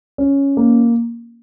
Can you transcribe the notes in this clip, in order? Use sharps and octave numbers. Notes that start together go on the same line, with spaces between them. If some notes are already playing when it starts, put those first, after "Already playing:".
C#4
A#3